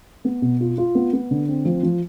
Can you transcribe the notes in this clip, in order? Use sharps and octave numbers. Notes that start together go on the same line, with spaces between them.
B3
B2
F4
F4
B3
B3
D3
C4
F3
F3